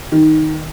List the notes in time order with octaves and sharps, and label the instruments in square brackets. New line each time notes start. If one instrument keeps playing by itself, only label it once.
[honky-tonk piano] D#3